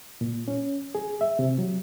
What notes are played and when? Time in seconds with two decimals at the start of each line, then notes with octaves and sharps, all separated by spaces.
0.21 A#2
0.48 C#4
0.95 G#4
1.21 E5
1.39 C3
1.58 F#3